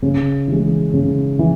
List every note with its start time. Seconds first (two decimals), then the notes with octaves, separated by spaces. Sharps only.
0.02 C#3
0.48 E3 G#3
0.93 C#3
1.39 E3